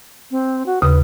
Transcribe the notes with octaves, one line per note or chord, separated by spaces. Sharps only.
C4
F#4
D#2 C#3 B4 D#6